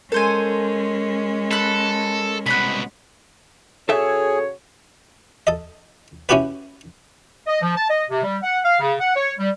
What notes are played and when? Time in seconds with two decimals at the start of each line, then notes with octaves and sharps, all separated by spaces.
0.12 G#3 C#4 A4 A#4 C5 G#5
1.51 A4 B5 F#6
2.46 C2 B2 F#5 B5
3.89 C#3 F#4 G#4 A4 C#5 E5
5.47 A4 D#5
6.29 C#4 E4 F#4 G4 B4
7.47 D#5
7.62 F3
7.76 A5
7.89 D#5
8.09 C3
8.24 G3
8.42 F#5
8.64 F5
8.80 C#3
9.00 F#5
9.15 C#5
9.38 G3